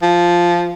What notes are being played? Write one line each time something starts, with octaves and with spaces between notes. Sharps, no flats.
F3